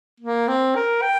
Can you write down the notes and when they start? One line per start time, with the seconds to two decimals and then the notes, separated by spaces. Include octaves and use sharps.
0.20 A#3
0.48 C4
0.75 A#4
1.02 G5